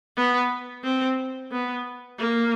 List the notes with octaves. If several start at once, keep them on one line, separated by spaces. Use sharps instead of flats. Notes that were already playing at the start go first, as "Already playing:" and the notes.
B3
C4
B3
A#3